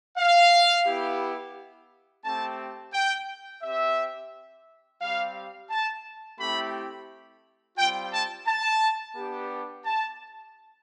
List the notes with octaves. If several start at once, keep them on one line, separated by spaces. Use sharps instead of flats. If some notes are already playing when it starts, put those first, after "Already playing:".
F5
B3 E4 G4
A3 C4 G4 A5
G5
C4 G4 E5
G3 C4 G4 F5
A5
A3 C4 E4 G4 B5
G3 C4 F4 G5
A5
A5
B3 D4 G4
A5